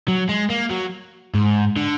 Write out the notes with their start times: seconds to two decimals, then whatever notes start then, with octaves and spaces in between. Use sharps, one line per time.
0.08 F#3
0.29 G#3
0.50 A#3
0.71 F#3
1.34 G#2
1.76 D3